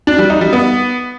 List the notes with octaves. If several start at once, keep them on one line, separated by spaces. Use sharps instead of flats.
D4
G3
D#4
G3
B3